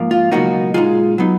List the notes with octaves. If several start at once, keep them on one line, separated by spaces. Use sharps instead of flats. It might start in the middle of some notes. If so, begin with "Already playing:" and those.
Already playing: G#2 F3 A#3
F4
C#2 B2 F#3 A#3 D#4 F#4
A#2 G#3 D#4 F4 G#4
F#3 B3 D#4